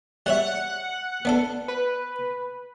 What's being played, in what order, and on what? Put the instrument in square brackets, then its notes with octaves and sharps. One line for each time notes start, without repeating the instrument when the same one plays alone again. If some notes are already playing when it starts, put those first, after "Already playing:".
[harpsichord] G3 C#5 E5 [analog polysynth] F#5
[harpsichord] B3 D4 A4
[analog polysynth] B4